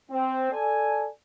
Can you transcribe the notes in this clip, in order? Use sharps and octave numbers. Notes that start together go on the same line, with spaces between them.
C4
A4 D5 G#5